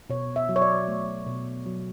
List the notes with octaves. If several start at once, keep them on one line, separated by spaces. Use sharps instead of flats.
B2 C#5
E5
F#3
C#5
D5
A3
B2
F#3